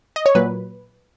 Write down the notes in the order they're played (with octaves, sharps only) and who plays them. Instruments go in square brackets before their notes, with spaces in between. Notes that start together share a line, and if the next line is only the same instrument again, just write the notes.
[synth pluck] D#5
C#5
A#2 F#3 B4